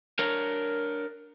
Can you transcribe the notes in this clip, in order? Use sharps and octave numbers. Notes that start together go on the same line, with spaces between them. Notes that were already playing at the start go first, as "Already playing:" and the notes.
D4 A#4 C#5